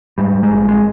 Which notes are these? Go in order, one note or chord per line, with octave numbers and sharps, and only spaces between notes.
G#2 G3
G#2
G#3
A#1
G#3